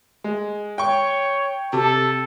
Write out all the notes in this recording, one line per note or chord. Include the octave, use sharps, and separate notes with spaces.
G#3
C#5 G5 C#6
C3 A4